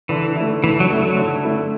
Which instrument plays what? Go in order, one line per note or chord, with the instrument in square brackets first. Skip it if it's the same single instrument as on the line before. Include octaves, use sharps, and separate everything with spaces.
[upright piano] D3 [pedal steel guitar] E3
[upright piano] A3 E4
[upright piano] D3 [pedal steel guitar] E3
[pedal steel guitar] F#3
[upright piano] A3 E4
[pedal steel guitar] F#3
[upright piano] D3
A3 E4